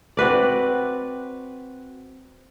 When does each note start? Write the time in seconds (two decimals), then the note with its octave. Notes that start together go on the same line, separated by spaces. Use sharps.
0.17 C4 F#4 B4 D5